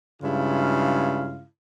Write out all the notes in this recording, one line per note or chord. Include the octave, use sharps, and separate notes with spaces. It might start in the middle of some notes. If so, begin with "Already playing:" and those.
G2 C#3 G#3 E4 F4 F5